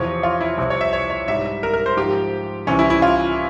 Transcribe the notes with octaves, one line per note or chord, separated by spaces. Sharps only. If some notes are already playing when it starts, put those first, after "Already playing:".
Already playing: E2 C3 F3 C#5
F4
E4
C2 C3 F3
C#5
E5
C#5
C#5
G#2 G3 E5
A#4
A#4
C5
G#2 F3 G4
C2 C3 E3 C#4
E4
E4
F4